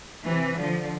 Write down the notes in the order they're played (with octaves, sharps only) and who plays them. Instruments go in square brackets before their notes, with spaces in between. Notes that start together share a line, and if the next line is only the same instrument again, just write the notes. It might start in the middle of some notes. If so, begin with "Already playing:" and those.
[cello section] C3 E3
D3 F3